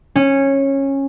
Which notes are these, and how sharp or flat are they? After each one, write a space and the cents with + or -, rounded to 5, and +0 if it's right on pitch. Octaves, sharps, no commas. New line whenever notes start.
C#4 -15